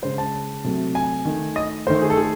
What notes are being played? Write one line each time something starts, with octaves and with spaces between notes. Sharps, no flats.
C#3 G#3 C5
A5
C3 F#3 A3
G#5
D#3 A3
D#5
D#3 A3 C5
G#4
A4
G#4